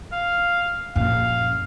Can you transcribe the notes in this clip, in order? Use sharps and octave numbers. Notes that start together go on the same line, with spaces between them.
F5
A#1 F#2 F5